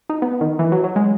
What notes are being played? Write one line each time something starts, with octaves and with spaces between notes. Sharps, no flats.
D#4
B3
D#3
E3
F#3
F#3
G#3